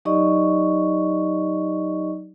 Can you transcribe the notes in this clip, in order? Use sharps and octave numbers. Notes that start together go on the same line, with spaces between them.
F#3 D#4 G4 D5 D#5 C#6